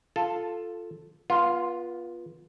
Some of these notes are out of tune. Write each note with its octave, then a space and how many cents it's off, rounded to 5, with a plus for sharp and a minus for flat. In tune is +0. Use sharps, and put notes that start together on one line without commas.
F4 +0 A4 +0 A5 +0
B3 -30 F4 +0